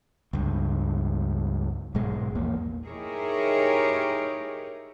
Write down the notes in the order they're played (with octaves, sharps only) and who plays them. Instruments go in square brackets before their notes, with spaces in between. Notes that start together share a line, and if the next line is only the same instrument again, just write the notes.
[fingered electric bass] C#2 G2
B1 G#2 G#3
A#1 E2 A#3
[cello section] D#4 E4 G4 G#4 A#4 C#5